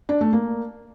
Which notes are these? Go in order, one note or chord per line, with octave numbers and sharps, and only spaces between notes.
D4
A3
A#3